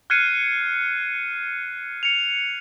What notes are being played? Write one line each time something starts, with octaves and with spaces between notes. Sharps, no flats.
F6 F#6 G#6 C7 C#7 D#7
C#7 F7